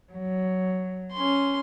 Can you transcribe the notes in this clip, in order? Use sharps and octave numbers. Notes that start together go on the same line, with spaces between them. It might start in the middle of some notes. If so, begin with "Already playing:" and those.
F#3
C#4 C6